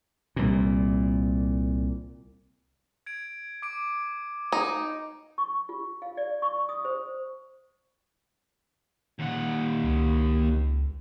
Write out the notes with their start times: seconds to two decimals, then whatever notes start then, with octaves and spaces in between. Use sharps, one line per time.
0.36 C2 A#2
3.06 G#6 D7
3.62 D6 D7
4.52 D#4
5.38 C#6
5.69 F4
6.02 F5
6.17 D5
6.42 C#6
6.69 D#6
6.85 C5
9.20 D#2 F#5
9.84 C#2